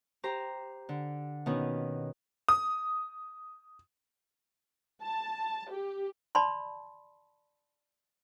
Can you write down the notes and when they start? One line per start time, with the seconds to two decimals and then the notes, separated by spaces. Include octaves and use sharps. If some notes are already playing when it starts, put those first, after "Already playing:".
0.23 G4 C5 A#5
0.89 D3
1.46 B2 D#3 B3 C#4
2.49 D#6
5.02 A5
5.71 G4
6.35 D5 A5 B5 C6